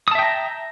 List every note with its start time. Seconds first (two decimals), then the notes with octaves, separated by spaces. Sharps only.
0.08 D#6
0.11 A5
0.15 E5
0.19 G5
0.23 A#5